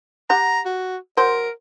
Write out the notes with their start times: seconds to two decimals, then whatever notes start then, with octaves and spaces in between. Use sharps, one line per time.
0.30 G4 F#5 A#5
0.65 F#4
1.17 F#3 A#4 C5